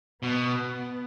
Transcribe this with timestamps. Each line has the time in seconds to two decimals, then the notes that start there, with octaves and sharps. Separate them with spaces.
0.22 B2 B3
0.54 B3